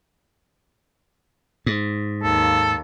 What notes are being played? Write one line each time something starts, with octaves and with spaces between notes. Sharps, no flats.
G#2
D#2 A4